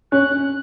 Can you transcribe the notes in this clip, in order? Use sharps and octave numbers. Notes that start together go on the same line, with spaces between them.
C#4 F#6